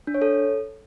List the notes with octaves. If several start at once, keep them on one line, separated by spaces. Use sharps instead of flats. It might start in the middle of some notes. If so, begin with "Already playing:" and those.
D4
C#5
A4